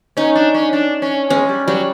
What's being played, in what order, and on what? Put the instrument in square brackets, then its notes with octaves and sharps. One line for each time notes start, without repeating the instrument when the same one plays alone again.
[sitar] C#4 [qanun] D#4
[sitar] D4
C#4
D4
C#4
[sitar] G#3 [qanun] C#4
[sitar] G3
[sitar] F#3 [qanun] G3